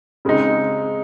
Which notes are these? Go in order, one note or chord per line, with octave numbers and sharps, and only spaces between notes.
C#3 G#3 C4 D#4